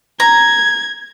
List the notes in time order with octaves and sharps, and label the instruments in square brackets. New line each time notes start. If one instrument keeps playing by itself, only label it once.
[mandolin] A#5 [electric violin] G#6